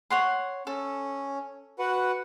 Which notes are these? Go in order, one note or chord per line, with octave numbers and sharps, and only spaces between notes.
C#5 F#5 C6
C#4 A4
F#4 B4 F#5